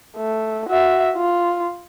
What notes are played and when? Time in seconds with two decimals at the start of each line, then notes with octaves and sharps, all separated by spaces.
0.17 A3
0.70 F#4 E5
1.16 F4